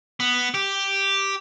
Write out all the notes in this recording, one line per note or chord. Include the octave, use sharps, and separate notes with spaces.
B3
G4